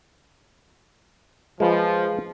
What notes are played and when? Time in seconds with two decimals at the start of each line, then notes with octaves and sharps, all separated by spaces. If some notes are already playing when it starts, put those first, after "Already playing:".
1.60 F3 G#3 B4